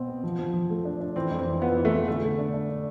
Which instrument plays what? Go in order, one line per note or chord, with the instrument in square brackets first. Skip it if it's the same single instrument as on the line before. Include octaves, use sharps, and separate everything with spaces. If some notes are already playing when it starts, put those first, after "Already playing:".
Already playing: [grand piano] B2 [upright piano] C4
[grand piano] B3
F3
F3
F3
A3
D4
D4
[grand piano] E3 [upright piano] C4
[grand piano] F2
[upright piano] C4
[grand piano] E3
[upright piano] B3 [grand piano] F4
[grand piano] E3
[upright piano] A3
[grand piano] B3
[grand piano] D3 [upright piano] A3
[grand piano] D3
D4
D4
D4